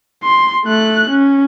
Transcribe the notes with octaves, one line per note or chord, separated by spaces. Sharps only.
C6
A3 F#6
C#4